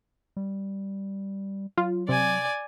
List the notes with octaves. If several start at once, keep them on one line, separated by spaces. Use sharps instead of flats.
G3
F#3 F4
C3 D5 G#5